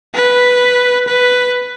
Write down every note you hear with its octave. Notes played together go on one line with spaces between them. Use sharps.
B4
B4